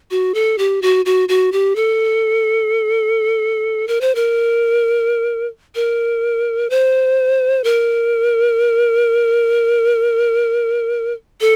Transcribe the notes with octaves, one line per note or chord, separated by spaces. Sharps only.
F#4
A4
G4
F#4
F#4
F#4
G4
A4
A#4
C5
A#4
A#4
C5
A#4
A4